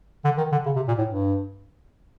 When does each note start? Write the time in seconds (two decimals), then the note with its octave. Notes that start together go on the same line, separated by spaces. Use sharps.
0.24 D3
0.37 D#3
0.52 D3
0.66 C#3
0.76 C3
0.88 A#2
0.98 A2
1.08 G2